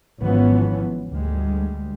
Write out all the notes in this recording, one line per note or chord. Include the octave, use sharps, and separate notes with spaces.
G#1 E3 F3 B3 C#4
D2 G3 G#3